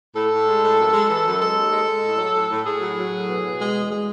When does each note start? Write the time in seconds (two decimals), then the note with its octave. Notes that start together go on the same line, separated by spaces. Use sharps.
0.15 A2 A4
0.31 A2
0.47 G#3
0.62 A2
0.78 F#2
0.93 G#3
1.09 E3
1.25 F#2
1.40 G#3 A4
1.56 D#2
1.72 G#3
1.87 G#3
2.03 A2
2.18 F#3
2.34 A2
2.49 A2
2.65 A2 G#4
2.80 F#3
2.96 F#3
3.12 A2
3.27 B2
3.43 B2
3.59 G#3
3.74 E2
3.90 G#3